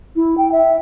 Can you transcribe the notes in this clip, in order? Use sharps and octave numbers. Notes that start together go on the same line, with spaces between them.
E4
G5
E5